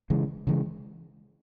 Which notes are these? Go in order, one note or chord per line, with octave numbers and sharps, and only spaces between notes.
C#3 E3 G#3
C#3 E3 G#3